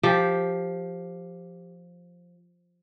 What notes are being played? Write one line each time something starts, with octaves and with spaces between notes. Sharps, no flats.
F3 G4